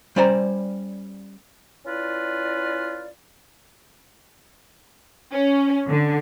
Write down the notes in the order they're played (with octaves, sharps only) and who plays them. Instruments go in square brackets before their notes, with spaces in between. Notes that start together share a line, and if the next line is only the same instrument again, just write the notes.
[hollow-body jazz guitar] G3 C#4 C5 D5 A#5
[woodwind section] C#4 E4 F4 B4 D5
[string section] C#4
D3